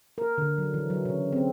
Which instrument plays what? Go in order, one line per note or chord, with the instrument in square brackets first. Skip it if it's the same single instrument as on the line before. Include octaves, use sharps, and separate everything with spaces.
[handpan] A#4
D3
F#3
E3
F#3
C#3
C4